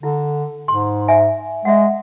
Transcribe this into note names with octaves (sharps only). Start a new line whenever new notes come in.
D3 E4
G#2 C6
E5 G#5
G#3 E5 F#5